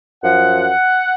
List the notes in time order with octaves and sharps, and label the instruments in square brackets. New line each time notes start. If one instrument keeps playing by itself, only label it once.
[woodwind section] F#2 F3 F#5